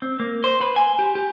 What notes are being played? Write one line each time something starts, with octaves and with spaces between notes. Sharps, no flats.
C4
A#3
C5
B4
G#5
G4
G4